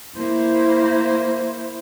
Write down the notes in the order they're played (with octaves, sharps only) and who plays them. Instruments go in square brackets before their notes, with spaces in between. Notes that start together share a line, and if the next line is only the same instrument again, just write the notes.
[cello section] A#3 E4 C5